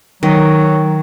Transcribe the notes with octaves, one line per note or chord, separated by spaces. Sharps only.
D#3 F#3